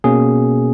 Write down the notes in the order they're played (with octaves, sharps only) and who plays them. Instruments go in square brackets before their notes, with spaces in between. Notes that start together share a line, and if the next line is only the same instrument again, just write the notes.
[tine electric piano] B2 A#3 C#4 G#4